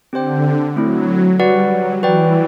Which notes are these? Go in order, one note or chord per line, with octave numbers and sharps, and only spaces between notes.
D3 C4 G4 C5 G5
F#3 A3 C4 E4
G3 F#4 B4 D5 F#5
F#3
E3 F#4 B4 D5 G5